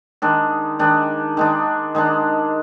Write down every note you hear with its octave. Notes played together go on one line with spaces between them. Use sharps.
D#3 G#3 D4
D#3 G#3 D4
D#3 G#3 D4
D#3 G#3 D4